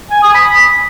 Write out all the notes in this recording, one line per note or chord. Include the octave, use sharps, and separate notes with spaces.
G#5
D#6
B5